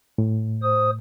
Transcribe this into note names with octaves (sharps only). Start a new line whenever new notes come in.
A2
C5 D#6